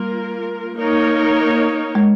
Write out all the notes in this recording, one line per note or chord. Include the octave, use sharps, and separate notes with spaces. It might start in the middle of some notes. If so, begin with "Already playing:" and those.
Already playing: G3 A#3 F4 A#4
A#3 D#4 A#4 C#5
G#3